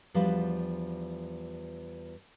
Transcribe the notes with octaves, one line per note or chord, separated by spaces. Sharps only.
E2 F3 G3 D4 F#4 B4